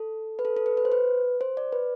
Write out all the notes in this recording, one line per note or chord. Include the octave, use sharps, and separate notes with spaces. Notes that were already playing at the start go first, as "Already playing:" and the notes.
Already playing: A4
B4
A4
A4
B4
B4
C5
B4
C5
D5
B4